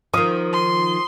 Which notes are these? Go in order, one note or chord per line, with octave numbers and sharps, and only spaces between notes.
D#3 F3 F4 C5 D#6
C6